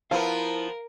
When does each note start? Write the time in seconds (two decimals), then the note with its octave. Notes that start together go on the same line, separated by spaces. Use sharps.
0.11 F3 B3 E4 A#4 F5